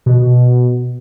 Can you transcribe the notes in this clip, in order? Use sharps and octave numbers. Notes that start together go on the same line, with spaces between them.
B2